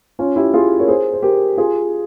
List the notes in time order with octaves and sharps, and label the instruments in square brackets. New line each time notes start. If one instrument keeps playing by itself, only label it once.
[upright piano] C#4 F4
E4 G4
F4 G#4
A#4 C#5
G#4 C5
C5
G4 A#4
F4 G#4